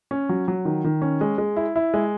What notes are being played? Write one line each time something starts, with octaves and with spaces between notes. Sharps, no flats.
C#4
F#3
F#3
D#3
D#3
C#4
G#3
G#3
E4
E4
G#3